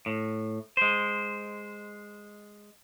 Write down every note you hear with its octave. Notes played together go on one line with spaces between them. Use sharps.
A2
G#3 C5